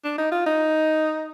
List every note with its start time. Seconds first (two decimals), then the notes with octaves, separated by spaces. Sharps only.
0.04 D4
0.18 D#4
0.32 F4
0.46 D#4